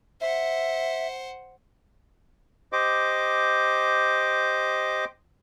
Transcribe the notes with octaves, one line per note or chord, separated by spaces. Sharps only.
C5 E5 F#5
G4 C5 D#5 D6